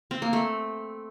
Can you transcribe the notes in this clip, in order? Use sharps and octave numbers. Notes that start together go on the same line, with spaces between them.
C4
A#3
A3